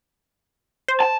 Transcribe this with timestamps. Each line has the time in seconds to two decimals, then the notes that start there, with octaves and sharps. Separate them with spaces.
0.88 C5
1.00 A5